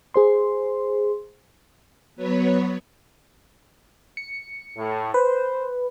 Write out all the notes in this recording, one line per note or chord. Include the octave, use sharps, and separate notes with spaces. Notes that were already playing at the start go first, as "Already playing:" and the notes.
G#4 C5 C6
F#3 B3 B4 C#5
C#7
A2
B4 C5